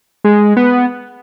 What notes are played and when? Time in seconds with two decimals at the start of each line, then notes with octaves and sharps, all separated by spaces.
0.24 G#3
0.57 B3